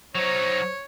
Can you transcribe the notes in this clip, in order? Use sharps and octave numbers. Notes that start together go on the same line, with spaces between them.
F#3 D#4 C5 C#5